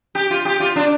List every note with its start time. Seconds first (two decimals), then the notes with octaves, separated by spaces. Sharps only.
0.15 G4
0.30 F4
0.45 G4
0.60 F4
0.76 D4